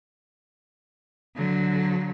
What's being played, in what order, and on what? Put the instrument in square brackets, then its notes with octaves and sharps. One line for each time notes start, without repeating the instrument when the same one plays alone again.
[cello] D3 F#3